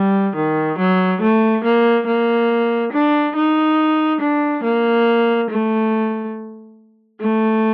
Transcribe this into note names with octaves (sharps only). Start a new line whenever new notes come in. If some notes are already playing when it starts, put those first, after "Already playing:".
Already playing: G3
D#3
F#3
A3
A#3
A#3
D4
D#4
D4
A#3
A3
A3